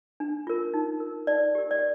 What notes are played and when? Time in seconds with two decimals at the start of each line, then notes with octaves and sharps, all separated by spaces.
0.20 D4
0.47 F4 A#4
0.74 D#4
1.00 A#4
1.27 D#4 D5
1.55 G4 A#4
1.71 D5